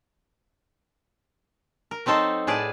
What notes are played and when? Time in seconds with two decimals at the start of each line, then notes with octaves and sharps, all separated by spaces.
1.91 A#4
2.06 F#3 C4 D#4 A4 C5
2.47 A2 G#4 B4 D5 A5